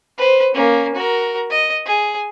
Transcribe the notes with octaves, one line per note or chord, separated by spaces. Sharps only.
B4 C5
A#3 C#4
F#4 A#4
D#5
G#4